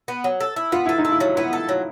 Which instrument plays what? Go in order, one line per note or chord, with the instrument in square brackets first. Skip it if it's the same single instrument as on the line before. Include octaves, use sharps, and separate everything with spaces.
[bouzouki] B3
F#3
A4
E4
[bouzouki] B3 [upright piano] F4
[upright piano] E4 [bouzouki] A4
[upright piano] D#4
[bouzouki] A4
[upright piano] E4
[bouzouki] F#3
[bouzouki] B3 [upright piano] E4
[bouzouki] A4
F#3